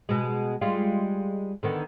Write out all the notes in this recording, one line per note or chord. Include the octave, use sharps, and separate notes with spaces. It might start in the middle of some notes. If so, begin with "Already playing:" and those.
B2 G#3
G3 G#3 F4
D3 D#3 B3